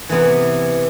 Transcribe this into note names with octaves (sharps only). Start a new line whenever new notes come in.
C3 E3 B3 E4